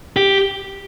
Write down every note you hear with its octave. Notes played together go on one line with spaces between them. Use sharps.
G4